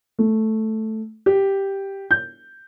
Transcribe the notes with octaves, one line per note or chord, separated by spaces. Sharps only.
A3
G4
G6